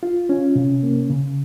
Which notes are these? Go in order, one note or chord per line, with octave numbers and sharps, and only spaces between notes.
F4
C#4
C3
A#3
C#3